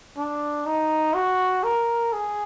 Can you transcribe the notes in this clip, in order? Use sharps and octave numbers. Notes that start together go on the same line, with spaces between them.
D4
D#4
F#4
A#4
G#4